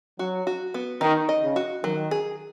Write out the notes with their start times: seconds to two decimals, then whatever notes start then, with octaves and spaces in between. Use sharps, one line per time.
0.19 F#3 F#4
0.47 F#4
0.74 B3
1.01 D#3 D#4
1.29 D#5
1.43 C#3
1.56 F#4
1.84 D#3 F#3
2.11 G#4